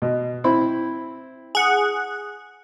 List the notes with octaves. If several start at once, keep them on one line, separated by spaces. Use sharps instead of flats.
B2
C4 E4 B5
G#4 F#5